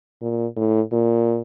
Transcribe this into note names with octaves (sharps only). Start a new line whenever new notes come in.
A#2
A2
A#2